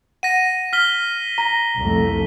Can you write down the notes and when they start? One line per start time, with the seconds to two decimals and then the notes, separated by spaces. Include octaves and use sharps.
0.23 F#5 A#6 D#7
0.73 F6 B6 G7
1.38 A#5 A#6
1.77 C2 F2 A3